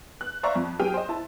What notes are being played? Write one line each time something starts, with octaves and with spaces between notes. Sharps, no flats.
F#6
C5 D5 E5 F5 A#5 C#6
F2
F#3 G4 G#4 G5 F6 D#7
C5 D#5
E4 A5